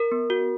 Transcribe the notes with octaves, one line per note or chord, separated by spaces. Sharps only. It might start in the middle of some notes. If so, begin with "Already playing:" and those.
Already playing: A#4
B3
F#4